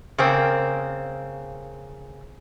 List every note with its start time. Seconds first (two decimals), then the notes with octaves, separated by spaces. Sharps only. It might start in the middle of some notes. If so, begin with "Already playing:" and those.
0.18 C#3 A#3 C4